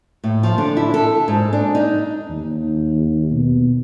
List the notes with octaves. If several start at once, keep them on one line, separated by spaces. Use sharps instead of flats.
A2
F3
D3
E4
A4
G#2
D4
D#4
D#2
B2